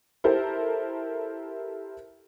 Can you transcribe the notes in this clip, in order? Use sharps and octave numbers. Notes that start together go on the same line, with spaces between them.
E4 G4 A4 A#4 C5